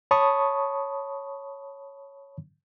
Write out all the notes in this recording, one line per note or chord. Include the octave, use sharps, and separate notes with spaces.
C#5 A5 B5 C#6 D#6